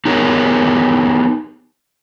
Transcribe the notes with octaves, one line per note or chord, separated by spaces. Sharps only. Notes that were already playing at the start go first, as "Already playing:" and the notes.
B3 D#4 G4 G#4 A#4 C#5